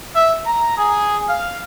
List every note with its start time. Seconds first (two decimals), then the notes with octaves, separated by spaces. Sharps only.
0.14 E5
0.45 A#5
0.77 G#4
1.28 F5